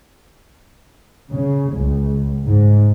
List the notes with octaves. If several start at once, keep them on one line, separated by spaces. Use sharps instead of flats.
C#3
C#2
G#2